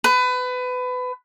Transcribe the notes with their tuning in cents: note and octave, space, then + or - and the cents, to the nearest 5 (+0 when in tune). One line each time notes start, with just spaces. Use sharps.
B4 +25